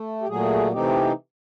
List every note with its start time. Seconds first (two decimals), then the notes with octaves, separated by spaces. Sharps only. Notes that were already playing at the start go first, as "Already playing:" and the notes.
Already playing: A3
0.22 G4
0.28 A#2 F#3 A3 G#4
0.72 C3 E3 A3 C4 D#4 G4